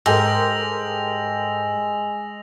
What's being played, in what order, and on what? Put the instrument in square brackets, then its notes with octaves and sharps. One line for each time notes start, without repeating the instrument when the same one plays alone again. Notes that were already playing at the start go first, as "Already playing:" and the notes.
[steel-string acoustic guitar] G#2 [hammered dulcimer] G#3 [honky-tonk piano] G4 A4 A#4 [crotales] E6 A#6 F7